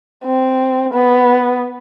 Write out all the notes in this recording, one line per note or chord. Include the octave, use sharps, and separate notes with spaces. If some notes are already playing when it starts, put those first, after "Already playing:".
C4
B3